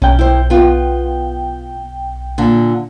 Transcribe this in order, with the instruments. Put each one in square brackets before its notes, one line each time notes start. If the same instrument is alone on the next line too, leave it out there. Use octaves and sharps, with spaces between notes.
[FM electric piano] B1 G5 [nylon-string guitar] C#4
[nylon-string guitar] E4 C5
B3 F4
A#2 D3